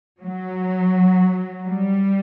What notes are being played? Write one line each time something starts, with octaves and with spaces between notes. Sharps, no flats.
F#3
G3